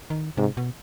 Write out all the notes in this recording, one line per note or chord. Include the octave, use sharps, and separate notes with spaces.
D#3
G#2 C3
B2